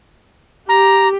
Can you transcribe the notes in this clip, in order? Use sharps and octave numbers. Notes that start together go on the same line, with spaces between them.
G4 A#5